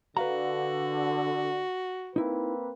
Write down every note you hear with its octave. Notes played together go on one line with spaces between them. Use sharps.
D3 F#4 B4 F5 A#5
A#3 C4 D#4 E4 B4